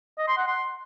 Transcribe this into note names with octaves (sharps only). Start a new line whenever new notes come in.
D#5
C6
F#5
C6